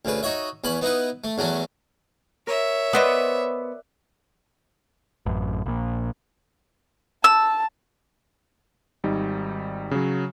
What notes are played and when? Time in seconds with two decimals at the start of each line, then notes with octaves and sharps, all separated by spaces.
0.05 D2 C#3 B4
0.23 D#4 F#4 C#5 E5
0.64 E2 C#4 B5
0.81 B3 D#4 E4 B4
1.24 A3
1.38 E2 F#3 A3 C#4
2.47 A#4 C#5 E5
2.93 B3 C5 D5 D#5 F#5 D#6
5.26 A1 F#2
5.66 A#1 A#2
7.24 A5 E6
9.04 G#1 G3 D#4
9.91 C#3 F#3